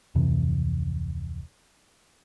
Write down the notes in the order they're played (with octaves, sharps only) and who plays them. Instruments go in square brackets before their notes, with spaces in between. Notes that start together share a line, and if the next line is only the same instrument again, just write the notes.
[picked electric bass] D1 F2 C3 E3